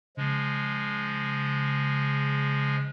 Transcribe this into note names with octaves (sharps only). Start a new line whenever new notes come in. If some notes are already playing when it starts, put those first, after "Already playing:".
C#3 F3 G#3